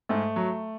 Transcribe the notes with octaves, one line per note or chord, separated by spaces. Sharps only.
G#2 A3
F#3